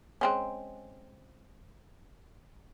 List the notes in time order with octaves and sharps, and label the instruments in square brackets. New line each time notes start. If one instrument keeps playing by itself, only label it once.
[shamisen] G#3 C4 C#4